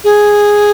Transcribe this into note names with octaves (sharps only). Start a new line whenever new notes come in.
G#4